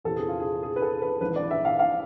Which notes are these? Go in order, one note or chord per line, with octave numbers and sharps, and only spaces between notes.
E2 C3 E3 A4
G#4
F4
G#4
G#4
B4
A4
B4
G#1 G#2 E3 B4
D5
E5
F5
F5